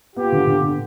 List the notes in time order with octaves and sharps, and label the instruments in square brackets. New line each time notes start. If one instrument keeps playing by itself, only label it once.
[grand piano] B3 [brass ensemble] F4 G4
[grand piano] D3
D3
D3